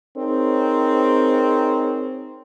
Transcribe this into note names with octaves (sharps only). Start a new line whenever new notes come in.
C4 D#4 G#4 A#4 C5 C#5